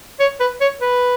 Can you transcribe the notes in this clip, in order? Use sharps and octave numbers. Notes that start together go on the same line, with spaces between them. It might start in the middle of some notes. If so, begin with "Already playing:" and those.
C#5
B4
C#5
B4